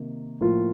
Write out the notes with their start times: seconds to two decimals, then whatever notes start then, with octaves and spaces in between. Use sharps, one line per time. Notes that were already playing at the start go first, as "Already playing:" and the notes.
Already playing: C3 D#3 A#3
0.41 A2 F3 A#3 F4